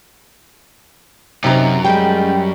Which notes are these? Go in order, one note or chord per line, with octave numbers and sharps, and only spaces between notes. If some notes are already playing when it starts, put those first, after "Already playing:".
F#2 C3 D#4 A#5
G3 G#3 G5